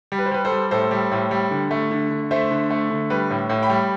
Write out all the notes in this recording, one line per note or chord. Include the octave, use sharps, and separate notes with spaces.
G3
B4
C5
G3 B4
A4 C5
G3
A2 A4 C5
G3
A2
G3
D3
A3
D3
D3
A3 C5 E5
D3
A3
D3
G3 B4
A2
A2
G5 B5
G3